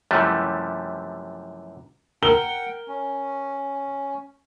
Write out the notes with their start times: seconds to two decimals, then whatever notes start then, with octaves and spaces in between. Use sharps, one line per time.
0.11 F#2 C3 E3 F3 G3 A3
2.23 A#4 F#5 G5 G7
2.88 C#4